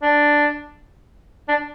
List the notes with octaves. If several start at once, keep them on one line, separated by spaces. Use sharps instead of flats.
D4
D4